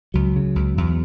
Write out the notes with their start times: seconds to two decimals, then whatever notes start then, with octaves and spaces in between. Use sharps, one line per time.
0.14 C#2 F#3
0.36 C#3
0.56 C#2
0.78 E2